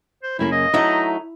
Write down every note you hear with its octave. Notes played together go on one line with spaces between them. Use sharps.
C5
F#2 C#3 A#3 E4
D#5
F#3 A3 D#4 E4